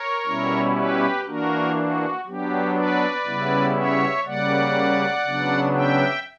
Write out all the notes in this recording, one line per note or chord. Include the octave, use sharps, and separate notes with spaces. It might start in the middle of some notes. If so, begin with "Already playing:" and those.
Already playing: A#4 C#5
B2 G3 C#4 E4
G4 B4
E3 A#3 D4 F#4 A#4
F#4
F#3 B3 D4 G4
B4 D5
C#3 G3 B3 E4
C#5 E5
C#3 G3 A#3 D5 F#5
C#3 F#3 B3 D4
E5 G5